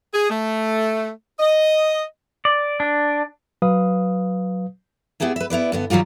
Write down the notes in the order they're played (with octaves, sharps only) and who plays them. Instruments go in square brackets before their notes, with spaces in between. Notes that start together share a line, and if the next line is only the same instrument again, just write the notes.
[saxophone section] G#4
A3
D#5
[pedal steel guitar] D5
D4
[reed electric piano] F#3 B4 F5 D#6
[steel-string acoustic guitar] B3 E4 G4 G#4 E5
B4 E5
B3 E4 B4 D5
G2 D3 B3
D#3 F#3 G3 F4 G4